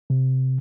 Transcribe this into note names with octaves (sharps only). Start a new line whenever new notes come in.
C3